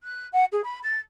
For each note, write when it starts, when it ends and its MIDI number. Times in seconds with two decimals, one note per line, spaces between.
0.03 0.27 90
0.32 0.44 78
0.52 0.61 68
0.64 0.79 83
0.83 0.99 93